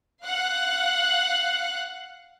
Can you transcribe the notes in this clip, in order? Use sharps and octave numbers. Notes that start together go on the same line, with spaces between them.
F5 F#5 F#6